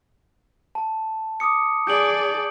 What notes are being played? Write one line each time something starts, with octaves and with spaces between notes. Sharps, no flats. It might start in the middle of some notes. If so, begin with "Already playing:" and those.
A5
D6 D#6 C#7
G#4 D5 G6 D7 F#7